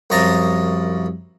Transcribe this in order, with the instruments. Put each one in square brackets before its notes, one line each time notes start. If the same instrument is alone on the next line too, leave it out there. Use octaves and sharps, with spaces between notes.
[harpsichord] C2 F#2 F3 D#5 A5 A#5